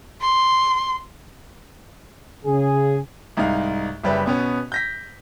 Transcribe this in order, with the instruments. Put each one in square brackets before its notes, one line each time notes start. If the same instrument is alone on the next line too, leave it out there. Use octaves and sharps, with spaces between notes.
[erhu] C6
[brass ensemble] C#3 G#4
[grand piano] C2 G#2 D#4 F5
F#1 G3 B4 E5
B2 B3 C#4
G6 A#6 B6